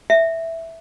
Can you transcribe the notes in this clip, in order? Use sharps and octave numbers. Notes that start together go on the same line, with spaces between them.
E5